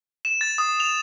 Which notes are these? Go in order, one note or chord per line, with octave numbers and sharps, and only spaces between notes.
E7
A6
D#6
F7